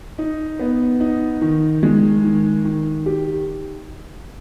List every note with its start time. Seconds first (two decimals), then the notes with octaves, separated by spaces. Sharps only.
0.18 D#4
0.60 B3
1.00 D#4
1.41 D#3
1.83 G#3
2.24 D#3
2.65 D#3
3.06 G4